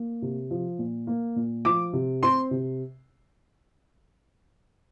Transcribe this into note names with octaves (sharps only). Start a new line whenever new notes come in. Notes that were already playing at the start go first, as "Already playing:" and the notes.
Already playing: A#3
C3
F3
A#2
A#3
A#2
F3 D6
C3
C4 C6
C3